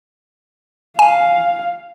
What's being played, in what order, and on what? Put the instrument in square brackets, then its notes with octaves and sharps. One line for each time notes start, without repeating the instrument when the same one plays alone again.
[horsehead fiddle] F5 [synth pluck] G#5